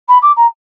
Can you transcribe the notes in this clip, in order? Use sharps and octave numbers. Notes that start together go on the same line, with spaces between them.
B5
D6
A#5